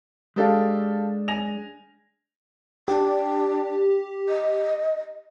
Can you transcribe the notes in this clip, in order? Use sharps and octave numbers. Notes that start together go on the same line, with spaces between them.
G#3 D4 G4 A4 F5
G#5 A#6 F7
D4 G4
D#5